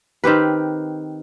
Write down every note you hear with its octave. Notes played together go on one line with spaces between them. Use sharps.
D#3 C4 G4 B4